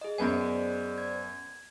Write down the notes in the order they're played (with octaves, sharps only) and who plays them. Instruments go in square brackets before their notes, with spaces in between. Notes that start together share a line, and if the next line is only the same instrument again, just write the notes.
[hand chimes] G#4 D#5
[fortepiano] F#2 B3 G#5 [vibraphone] C5 D5
[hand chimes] G#6